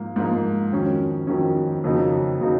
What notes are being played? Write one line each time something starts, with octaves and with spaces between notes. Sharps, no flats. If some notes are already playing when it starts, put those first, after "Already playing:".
Already playing: G#2 F3 A#3
G#2 F3 A#3
F2 D#3 F#3 C#4
F2 D#3 F#3 C#4
F2 C#3 F#3 A#3 D#4
C#3 F#3 A#3 D#4